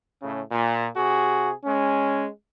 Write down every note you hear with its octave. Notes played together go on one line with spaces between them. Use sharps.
A2 C#3
A#2
C3 F#4 G#4
G#3 C#4